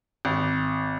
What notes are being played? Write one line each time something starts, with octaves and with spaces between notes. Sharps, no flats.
G#1